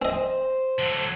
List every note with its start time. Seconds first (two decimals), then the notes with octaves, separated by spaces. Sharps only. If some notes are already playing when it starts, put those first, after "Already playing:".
0.02 C4 C5 D#5
0.79 D3 F#3